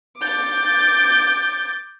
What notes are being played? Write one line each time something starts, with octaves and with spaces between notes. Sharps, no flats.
D6 G6 A6